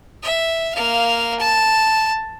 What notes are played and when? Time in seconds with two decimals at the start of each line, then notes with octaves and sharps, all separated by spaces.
0.23 E5
0.75 A#3 F5
1.40 A5